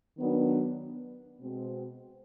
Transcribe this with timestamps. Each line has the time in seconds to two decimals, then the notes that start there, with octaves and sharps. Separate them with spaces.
0.17 D#3 F#3 B3 D4
1.40 B2 G#3 C4